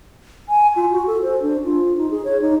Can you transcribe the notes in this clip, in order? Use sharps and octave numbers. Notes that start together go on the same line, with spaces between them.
G#5
F4
F#4
A4
C5
D4
F4
D#4
G#4
C#5
D#4